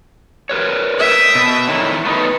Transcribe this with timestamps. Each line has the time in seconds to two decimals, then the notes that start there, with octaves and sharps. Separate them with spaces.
0.49 A#4 B4 C#5
1.00 E5 G5 D#6
1.35 B2
1.68 D3 D#3 E4 C#5
2.05 A3 B3 D#4 B4